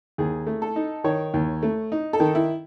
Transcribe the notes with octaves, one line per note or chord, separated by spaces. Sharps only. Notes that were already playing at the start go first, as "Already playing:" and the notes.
D#2 G#4
A3
A4
D#4
D#3 C#5
D#2
A3
D#4
A4
D#3
E4